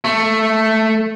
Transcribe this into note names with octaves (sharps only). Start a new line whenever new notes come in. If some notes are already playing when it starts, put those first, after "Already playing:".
A3